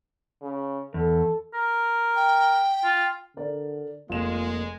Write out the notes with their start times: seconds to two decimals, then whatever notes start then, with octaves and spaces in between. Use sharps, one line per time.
0.42 C#3
0.94 E2 A4
1.54 A#4
2.16 G5
2.84 F4
3.37 D3 A#4 D5
4.10 F1 G#3 A#3 F4 E7